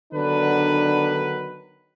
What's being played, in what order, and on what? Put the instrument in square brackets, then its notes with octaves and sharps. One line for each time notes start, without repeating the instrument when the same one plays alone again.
[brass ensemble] D3 D#3 F#3 B3 D4 B4